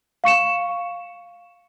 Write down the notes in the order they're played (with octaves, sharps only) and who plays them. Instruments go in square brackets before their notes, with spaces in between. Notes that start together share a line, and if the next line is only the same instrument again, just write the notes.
[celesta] F5 C#6 C#7 E7